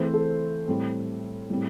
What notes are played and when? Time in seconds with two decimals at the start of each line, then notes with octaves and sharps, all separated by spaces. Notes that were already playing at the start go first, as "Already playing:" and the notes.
Already playing: E3 A3 C4 C5
0.14 A4
0.68 A2 G3 C4
1.50 A2 G3 C4